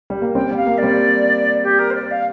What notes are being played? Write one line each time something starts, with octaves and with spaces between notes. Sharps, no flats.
G3
A#3
G3 C4 G5
G3 G5
F5
A#3
D5
G3 C4
G4
A#4
C5
D5
F5